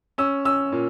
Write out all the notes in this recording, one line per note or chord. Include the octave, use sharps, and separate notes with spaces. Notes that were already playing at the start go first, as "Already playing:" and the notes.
C#4 E6
C#4 E6
A#2